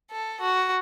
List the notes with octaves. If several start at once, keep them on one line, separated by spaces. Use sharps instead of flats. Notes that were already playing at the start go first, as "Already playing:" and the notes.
A4
F#4